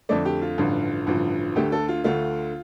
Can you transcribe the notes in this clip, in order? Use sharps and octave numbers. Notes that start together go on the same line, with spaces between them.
F2 D3 A3 D5
G4
F4
A1 G2 D3 F3
A1 G2 D3 F3
D2 D3 A3 G4
A4
F4
D2 D3 A3 F4